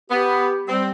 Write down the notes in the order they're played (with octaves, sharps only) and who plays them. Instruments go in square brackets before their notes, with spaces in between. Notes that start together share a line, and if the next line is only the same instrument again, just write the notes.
[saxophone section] B3 [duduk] G4
[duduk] G3 [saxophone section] C4